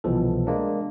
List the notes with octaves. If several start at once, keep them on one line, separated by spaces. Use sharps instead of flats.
C2 B2 E3 F3 A4
G#3 A#3 D4